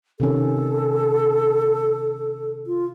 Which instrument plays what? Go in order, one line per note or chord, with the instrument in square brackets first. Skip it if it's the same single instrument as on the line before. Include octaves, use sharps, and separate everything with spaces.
[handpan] C3 D#3 C#4 [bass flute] A4
[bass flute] F4